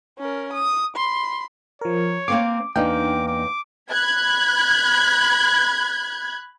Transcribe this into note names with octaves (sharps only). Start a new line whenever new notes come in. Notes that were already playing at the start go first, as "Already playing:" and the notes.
C#4 A#4
D#6
B5 C6
F3 A#4 C#5
A#3 C4 F5 D6
E2 A#3 D4 D#4 G5 D6
D6
B5 F#6 G#6